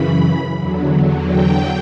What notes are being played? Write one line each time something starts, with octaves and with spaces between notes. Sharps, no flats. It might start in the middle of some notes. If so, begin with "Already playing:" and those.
Already playing: F#2 C#3 E3 B5
E2 D3 F#3
G5